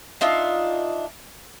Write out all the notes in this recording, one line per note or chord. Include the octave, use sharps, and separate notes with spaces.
D4 D#4 F4 E5